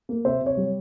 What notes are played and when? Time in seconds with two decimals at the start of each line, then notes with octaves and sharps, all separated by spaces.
0.09 A#3
0.25 C3 C5 E5
0.41 C3
0.46 C#5
0.57 G3